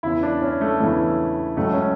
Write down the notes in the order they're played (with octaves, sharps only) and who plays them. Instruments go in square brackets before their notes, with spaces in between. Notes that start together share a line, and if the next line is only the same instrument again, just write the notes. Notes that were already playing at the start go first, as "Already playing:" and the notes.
[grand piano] E2 C#3 E3 E4
D4
C#4
A3
E2 C#3 E3 A3
C#2 C#3 F#3 A3
C#4